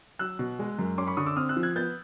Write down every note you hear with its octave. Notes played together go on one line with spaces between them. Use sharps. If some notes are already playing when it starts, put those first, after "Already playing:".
F#3 E6 F#6
B2
G#3
F#2
C#4 C6 D6
B5 C#6
D3 C#6 D#6
D6 E6
C4 D#6 F6
E6 F#6
F3
F#6 G#6
B3 G6 A6